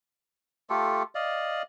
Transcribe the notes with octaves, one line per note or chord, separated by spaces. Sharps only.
A3 F4 G4 A4
D5 D#5 F5